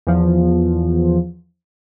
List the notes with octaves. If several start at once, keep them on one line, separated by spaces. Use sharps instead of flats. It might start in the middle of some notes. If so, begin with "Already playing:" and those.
E2 F3